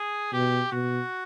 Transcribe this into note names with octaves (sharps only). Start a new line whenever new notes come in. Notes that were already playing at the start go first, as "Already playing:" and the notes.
Already playing: G#4
B2 G4
B2 F#4